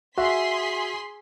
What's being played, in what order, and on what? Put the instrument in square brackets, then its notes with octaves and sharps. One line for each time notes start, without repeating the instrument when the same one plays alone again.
[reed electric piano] F#4 [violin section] G#4 C6 B6 [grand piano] E5